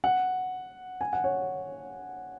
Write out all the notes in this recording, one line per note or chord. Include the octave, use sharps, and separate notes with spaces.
F#5
G#5
F#5
C#5